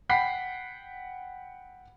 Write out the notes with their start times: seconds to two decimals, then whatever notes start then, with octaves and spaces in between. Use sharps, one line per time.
0.09 F#5 G5 B5 B6 C7